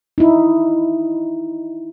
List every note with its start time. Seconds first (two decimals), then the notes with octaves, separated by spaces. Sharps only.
0.18 D#4 E4